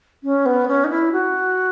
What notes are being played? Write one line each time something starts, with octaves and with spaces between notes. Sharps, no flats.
C#4
B3
C#4
D#4
E4
F#4